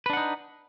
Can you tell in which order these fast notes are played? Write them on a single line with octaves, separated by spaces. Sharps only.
B4 D4 F#5 D#4